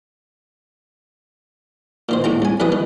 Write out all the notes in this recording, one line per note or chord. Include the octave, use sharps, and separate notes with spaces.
A#2 D#3 C5
D#2 A2 G5 A#5
C2 G#5
B1 E3 G3 B4 D#6
D#3